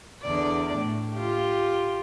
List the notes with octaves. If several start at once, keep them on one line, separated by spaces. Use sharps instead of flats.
E2 D3 D5
A2
F4 G4